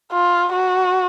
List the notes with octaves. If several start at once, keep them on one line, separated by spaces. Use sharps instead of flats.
F4
F#4